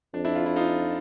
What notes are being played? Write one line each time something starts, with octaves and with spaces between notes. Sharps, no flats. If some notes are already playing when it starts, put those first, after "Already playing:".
F2 D4
D4 E4
F4
E4
D#4 F4